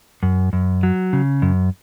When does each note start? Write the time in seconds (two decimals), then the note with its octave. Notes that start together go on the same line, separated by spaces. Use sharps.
0.23 F#2
0.53 F#2
0.83 F#3
1.13 C#3
1.42 F#2